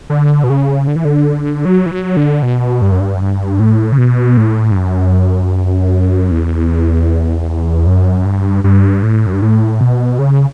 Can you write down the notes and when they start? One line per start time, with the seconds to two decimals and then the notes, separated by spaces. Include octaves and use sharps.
0.10 D3
0.44 B2
0.50 C#3
0.87 D3
0.96 E3
1.05 D3
1.65 F#3
1.86 E3
1.91 F#3
2.17 D3
2.42 B2
2.82 G2
2.92 F#2
3.00 G2
3.15 F#2
3.21 G2
3.60 A2
3.92 C#3
3.98 B2
4.37 A2
4.71 G2
4.76 F#2
6.31 E2
7.87 F#2
8.25 G2
8.64 G2
9.03 A2
9.27 F#2
9.33 G2
9.42 A2
9.81 B2
10.19 C#3